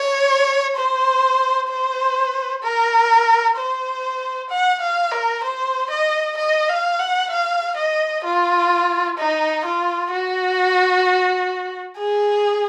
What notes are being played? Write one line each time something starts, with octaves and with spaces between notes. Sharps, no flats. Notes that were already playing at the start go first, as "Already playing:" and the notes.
Already playing: C#5
C5
C5
A#4
C5
F#5
F5
A#4
C5
D#5
D#5
F5
F#5
F5
D#5
F4
D#4
F4
F#4
G#4